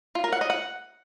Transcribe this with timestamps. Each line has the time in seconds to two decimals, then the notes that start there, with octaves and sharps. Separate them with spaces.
0.15 F4
0.24 A#4
0.33 F#5
0.41 D#5
0.50 F#5